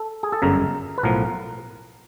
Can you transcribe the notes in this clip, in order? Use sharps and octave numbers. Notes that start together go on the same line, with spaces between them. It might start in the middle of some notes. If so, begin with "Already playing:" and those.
Already playing: A4
G#4
A4
G1 F#2 C#3 A#4
B4
B1 A2 F3 A#4